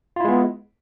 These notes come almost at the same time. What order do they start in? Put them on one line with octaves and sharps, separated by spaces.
F4 E4 G#3 B3